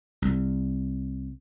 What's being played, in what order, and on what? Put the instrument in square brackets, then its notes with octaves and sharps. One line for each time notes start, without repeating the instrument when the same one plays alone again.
[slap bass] C2